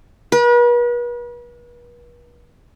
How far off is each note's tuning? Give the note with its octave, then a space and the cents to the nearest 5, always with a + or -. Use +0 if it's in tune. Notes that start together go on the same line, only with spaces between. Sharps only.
B4 -40